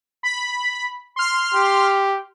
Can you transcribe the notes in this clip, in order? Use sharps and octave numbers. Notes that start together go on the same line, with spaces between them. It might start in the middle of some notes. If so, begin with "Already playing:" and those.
B5
C6 F6
G4